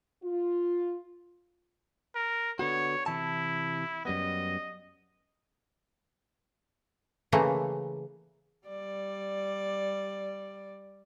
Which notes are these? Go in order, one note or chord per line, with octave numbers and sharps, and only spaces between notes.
F4
A#4
D3 B3 F#4 C#5
C3 E3 E4 A5
F#2 G3 B3 D#5
C#3 E3 A3 A#3
G3 D5